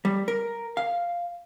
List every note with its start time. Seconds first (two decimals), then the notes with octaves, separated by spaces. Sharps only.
0.05 G3
0.28 A#4
0.77 F5